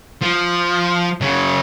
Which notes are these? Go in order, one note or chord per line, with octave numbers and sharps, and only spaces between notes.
F3
C#3 F#3